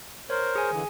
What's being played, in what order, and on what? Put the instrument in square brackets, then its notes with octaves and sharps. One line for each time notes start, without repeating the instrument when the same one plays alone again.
[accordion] A#4 C5 [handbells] C#5
[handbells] G#4 G#5
[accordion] D3 E3